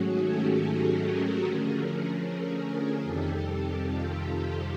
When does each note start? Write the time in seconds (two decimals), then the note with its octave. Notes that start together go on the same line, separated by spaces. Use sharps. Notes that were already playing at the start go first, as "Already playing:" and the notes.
Already playing: G#2 D#3 F#3 A3 C#4 F#4 G#4
0.21 G4 A4
1.02 G#4 A#4
1.42 D3 F3 A3 C#4 G#4 A#4
2.23 G#4 A#4
2.63 G#4 A#4
3.04 F2 C3 D#3 G3 G4 A4
3.84 F4 G4
4.25 F4 G4